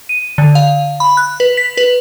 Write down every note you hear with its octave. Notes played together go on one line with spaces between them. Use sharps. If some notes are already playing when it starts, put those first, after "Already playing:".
D#7
D3
F5
B5
F#6
B4
B6
B4